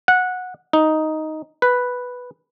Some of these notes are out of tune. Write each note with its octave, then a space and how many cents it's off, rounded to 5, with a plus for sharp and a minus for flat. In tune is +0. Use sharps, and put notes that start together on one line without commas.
F#5 -15
D#4 +5
B4 +0